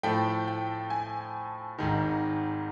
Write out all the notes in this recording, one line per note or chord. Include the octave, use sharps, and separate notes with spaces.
A2 F3 A3 G5
G5
G#5
G#1 G#2 D#3